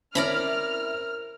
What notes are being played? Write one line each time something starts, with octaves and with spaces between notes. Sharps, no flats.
C4 C#4 E4 A#4 D5 A#5 B5 F6